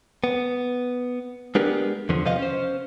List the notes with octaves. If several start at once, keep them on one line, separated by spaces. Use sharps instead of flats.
B3
G#3 B3 D4 G4 A#4
E2 D3 F3
C3 F3 B3 D#5 F5
C#4 C5